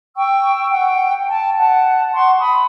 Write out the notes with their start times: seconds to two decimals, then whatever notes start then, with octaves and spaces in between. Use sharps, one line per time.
0.16 G5 C#6 E6
0.71 F#5 G5
1.28 A5
1.58 F#5 A5
2.14 F#5 C6 C#6
2.39 B5 D#6